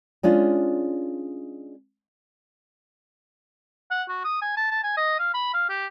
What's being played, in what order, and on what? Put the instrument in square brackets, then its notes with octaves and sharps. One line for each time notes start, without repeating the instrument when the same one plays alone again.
[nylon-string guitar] G#3 C#4 D4 F4
[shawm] F#5
F#4
D#6
G#5
A5
A5
G#5
D#5
F5
B5
F5
G4